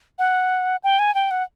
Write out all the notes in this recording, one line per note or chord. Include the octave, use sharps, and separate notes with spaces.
F#5
G5
G#5
G5
F#5